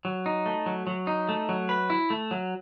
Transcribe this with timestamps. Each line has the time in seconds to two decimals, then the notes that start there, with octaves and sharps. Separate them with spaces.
0.05 F#3
0.26 D#4
0.46 A3
0.66 F#3
0.87 F#3
1.07 D#4
1.29 A3
1.49 F#3
1.69 B4
1.90 E4
2.10 A3
2.31 F#3